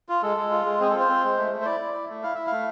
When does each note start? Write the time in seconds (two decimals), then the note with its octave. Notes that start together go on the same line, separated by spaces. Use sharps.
0.09 F4
0.23 G#3 A4
0.37 G#3
0.51 F4
0.65 G#3
0.80 C4 G#4
0.90 A4
0.95 F4 C5
1.08 C4
1.23 G#3
1.37 A3
1.52 A3
1.61 C5
1.65 E4 D5
1.80 E4
1.94 E4
2.09 A3
2.23 E4 F5
2.34 E4 E5
2.47 F5
2.52 A3